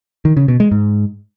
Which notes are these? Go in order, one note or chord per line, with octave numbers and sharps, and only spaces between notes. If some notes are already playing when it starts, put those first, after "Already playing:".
D#3
C#3
B2
G#3
G#2